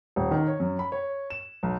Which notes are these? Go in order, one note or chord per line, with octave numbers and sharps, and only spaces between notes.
D#1
D#3
C#5
F#2
B5
C#5
E7
B1